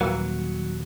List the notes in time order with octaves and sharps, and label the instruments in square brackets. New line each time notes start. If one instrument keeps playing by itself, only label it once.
[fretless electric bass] D#1 D#2 [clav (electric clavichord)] E3 A#3 [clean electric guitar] F#3